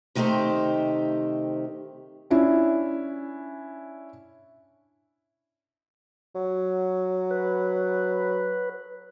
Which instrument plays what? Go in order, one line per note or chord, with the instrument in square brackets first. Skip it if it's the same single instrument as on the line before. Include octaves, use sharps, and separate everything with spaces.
[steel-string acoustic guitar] C3 D#3 A3 D#4 G4 C5
[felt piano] C#4 D4 E4
[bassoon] F#3
[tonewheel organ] B4